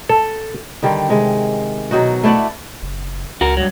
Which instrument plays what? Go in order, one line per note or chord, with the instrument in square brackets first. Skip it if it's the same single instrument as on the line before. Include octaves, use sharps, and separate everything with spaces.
[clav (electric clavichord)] A4
[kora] D3 D#3 G3
C3 G#3
B2 F#3 D#4 F#4
A3 E4 D5 F#5
[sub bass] F#1
[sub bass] C#2 [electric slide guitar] F#4 A#4
[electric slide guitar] G2 F#3